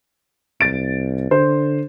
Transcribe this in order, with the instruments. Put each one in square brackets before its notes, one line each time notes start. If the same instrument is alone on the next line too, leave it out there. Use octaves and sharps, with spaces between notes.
[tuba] C2 [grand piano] A6 D7
[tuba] D3 [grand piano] C5